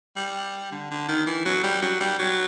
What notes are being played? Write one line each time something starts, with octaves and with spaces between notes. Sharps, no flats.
G3
D3
D3
D#3
E3
F#3
G3
F#3
G3
F#3